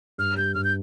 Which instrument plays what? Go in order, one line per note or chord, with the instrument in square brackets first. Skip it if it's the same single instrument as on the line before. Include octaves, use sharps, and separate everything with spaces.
[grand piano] G2 [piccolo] F6
[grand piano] G3 [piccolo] G6
[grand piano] G2 [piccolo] F6
[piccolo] G6